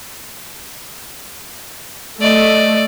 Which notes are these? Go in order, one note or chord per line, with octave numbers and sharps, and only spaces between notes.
A3 D5 D#5